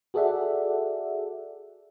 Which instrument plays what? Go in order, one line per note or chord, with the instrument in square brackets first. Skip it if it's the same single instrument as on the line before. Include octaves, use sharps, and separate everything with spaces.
[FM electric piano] F#4 G#4 A4 D5 E5 F#5